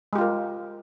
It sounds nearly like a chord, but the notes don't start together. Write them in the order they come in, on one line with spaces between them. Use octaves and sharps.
G#3 G4 F4 A#4